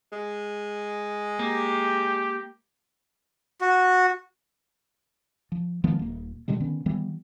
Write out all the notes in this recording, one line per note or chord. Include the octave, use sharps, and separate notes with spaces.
G#3
A#3 G4
F#4
F3
D#3 F3 G#3 B3
D#1 A#3
B2 D3 G3 G#3
D3 D#3 B3 C#4
D#3 E3 G3 B3